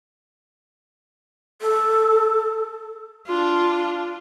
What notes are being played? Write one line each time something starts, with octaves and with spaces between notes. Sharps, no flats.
A4
D4 F4